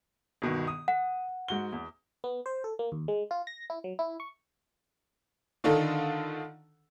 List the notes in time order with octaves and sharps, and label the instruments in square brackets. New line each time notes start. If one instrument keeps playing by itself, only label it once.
[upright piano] G1 B2 D#3
D#6
[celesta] F#5
[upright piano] G#2 F#4 G7
E2
[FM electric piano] B3
C5
A4
A#3
D#2
G#3
F4
A#6
E4
F#3
E4
C#6
[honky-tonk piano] D3 D#3 D4 D#4 F4 A4